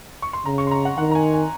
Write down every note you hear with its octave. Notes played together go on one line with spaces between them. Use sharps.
C#6
C6
C#3 A#5
C#6
C6
A#5
F#5
D#3 F#5
A#5
G#5
G#5